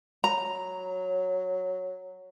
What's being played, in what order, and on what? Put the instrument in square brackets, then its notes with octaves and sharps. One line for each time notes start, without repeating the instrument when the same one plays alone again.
[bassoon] F#3 [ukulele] A#5